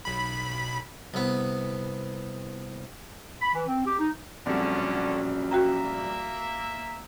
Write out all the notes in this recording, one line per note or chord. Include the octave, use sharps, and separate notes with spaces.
B1 B5
C2 B3
B5
E3
C4
G4
D#4
A#1 F#2 D3 G3 C4 C#4
A#3 F#4 E5 G5 A#5